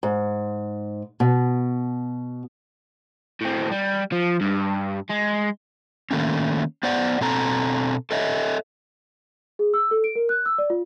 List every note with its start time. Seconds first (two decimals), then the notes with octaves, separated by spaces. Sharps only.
0.03 G#2
1.20 B2
3.41 A2 C4
3.71 G3
4.12 F3
4.41 G2
5.10 G#3
6.11 D#3 A3 A#3 C#4
6.83 B3 C5 D5 F#5
7.21 B2 C4 A4 A#5
8.11 A4 C#5 D#5 E5
9.59 G#4
9.74 E6
9.91 A4
10.04 D7
10.16 A#4
10.29 F#6
10.46 E6
10.58 D5
10.70 F4